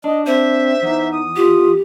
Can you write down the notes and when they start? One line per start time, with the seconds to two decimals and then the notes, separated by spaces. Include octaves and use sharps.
0.04 D4 D#5
0.26 C4 C5 E5
0.83 E2 D#4
1.12 D#6
1.36 F4 G4